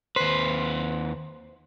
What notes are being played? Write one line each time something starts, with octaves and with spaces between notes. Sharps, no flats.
D#2 B4 C5